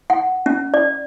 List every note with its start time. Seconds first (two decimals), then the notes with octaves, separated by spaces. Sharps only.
0.10 F#5
0.46 C#4
0.74 D5